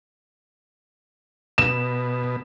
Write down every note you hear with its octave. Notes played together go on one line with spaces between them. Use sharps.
B2 E7